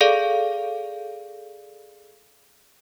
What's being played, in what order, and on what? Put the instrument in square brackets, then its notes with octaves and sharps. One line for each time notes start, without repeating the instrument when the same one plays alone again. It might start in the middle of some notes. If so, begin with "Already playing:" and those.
[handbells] G#4 A4 D5 F5